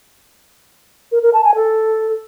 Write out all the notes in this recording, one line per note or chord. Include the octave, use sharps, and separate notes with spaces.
A#4
A#4
A5
G#5
A4